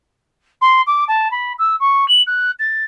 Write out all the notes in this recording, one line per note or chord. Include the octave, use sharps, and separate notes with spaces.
C6
D6
A5
B5
E6
C#6
F#7
F#6
A6